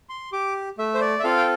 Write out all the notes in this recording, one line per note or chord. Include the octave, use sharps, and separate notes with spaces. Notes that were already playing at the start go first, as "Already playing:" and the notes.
C6
G4 D6
A3 E5
C5
D5
E5
C4 F4 A4 F5
G5